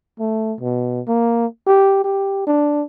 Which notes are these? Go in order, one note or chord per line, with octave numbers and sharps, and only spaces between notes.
A3
B2
A#3
G4
G4
D4